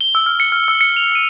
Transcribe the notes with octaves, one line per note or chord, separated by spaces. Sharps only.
G7
E6
F6
C#7
F6
E6
C#7
F7
D#7